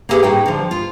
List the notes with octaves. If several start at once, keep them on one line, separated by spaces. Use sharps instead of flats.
A#3 B3 C#4 G4 G#4 B4
A2 D#4 F#4 G5
D3 F3
F4